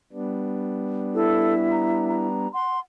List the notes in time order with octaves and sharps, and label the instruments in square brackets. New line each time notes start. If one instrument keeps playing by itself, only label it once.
[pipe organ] G3 B3 D4
[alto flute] E4 [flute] A4
[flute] A#5
A#5
[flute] F#5 [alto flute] C6